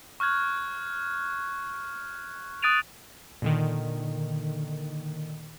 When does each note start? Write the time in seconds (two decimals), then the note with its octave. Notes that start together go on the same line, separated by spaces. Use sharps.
0.20 C#6 F6 F#6 G#6
2.62 D#6 F#6 A6 D7 D#7 F7
3.42 A#2 D3 D#3